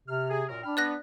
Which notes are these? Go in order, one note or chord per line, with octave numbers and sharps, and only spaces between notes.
C3 F6
G#4
F#2 A#2 A#4
D4 G5 B5 F6
B3 D5 F#6 A#6